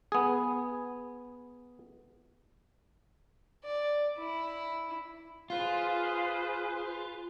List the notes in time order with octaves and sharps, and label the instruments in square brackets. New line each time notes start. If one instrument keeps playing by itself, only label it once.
[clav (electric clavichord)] B3 G#4
[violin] D5
E4
[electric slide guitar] F4 [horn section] G#4 B4 C5